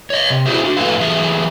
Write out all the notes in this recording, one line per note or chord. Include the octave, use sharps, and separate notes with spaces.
C#5 D#5
C3
E4 F#4 G#4 C5 E5
D4 F#4
F2 A2 A4 B4 F5
E3 F#3 A3 G4 G#4 E5